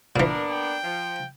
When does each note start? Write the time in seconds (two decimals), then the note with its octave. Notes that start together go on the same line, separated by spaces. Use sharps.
0.16 A#2 E3 A#3 B3 D4 A#4
0.51 G5
0.83 F3